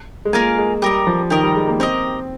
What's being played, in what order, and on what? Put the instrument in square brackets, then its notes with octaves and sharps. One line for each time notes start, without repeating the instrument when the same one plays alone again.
[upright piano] G#3
[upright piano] A#3 [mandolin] F4 A#4 F5 G#5
[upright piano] G#3
[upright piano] G3 [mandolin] G4 A#4 D#5
[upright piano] F3
[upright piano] D#3 [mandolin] G4 A#4 D#5
[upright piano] G3
G#3
A#3
[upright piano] C4 [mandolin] G4 A#4 D#5